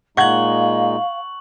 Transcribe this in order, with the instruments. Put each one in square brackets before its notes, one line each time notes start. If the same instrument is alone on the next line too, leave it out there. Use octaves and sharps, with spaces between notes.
[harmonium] A#2 G#3 D#4 [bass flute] F5 [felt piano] F#5 G#6 [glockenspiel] C#6 F#7